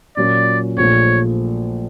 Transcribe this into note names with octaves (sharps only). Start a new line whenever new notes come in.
A#2 F#3 A#3 C#4 F4 D5
A#1 A#2 F3 A3 C#5